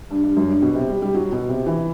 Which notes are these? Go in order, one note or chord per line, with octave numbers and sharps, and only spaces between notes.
G2
G2
F#2
G2
B2
C3
G3
G3
F#3
B2
C3
E3